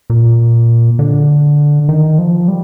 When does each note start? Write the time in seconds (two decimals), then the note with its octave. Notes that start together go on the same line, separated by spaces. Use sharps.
0.10 A#2
0.99 D3
1.89 D#3
2.18 F3
2.48 G3